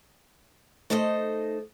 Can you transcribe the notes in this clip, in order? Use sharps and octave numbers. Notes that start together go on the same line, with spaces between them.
A3 D#4 A4 C5 D#5